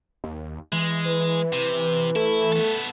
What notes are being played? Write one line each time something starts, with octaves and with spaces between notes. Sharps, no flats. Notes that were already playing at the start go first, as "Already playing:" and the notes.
D#2
E3 G#3
B4
C3
A3 E4
B3 A4